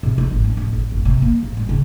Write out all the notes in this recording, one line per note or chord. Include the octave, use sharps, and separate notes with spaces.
C3
D#4
G#1
D4
D1
A1
F1
C3
A#3
A1
G3
C#3